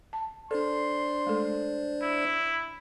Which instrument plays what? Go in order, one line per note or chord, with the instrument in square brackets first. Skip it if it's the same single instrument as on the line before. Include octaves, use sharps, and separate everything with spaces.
[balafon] A5
[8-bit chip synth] D4 C5 D5 [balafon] A4 [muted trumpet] C6
[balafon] G#3 A3 A4
[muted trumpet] E4